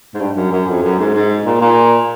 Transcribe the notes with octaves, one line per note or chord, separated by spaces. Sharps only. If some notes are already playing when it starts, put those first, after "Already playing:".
G#2
G2
F#2
F#2
F2
F#2
G#2
G#2
A#2
A#2